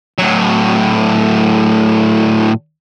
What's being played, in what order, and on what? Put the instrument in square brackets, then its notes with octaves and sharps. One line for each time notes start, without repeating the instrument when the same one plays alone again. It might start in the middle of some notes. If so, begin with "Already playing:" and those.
[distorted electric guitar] A2 F#3